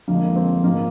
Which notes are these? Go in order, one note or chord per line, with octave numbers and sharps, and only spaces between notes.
F2 D3 F3 G#3 A#3
C4
G#2 F3 G#3 A#3